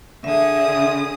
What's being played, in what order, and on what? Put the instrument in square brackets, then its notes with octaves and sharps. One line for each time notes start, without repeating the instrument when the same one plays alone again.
[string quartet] D3 G#4 D#6 [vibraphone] E5